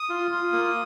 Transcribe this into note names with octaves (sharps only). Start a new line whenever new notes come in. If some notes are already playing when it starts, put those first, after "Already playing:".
Already playing: D#6
F4
F4
A#3